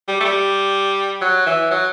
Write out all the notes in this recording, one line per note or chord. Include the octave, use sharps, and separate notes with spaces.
G3
A3
G3
F#3
E3
F#3